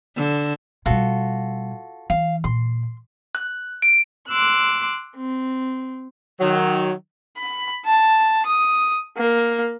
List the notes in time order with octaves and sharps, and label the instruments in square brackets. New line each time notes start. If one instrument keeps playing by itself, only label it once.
[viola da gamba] D3
[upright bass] B2 G3 [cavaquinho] F4 F#4 A4
[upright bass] E3 [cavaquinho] F5
[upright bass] A#2 [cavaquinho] C6
[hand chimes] F#6
D7
[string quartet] C6 D6 E6 F#6
C4
[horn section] D#3 F#3
[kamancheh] B5
A5
D#6
A#3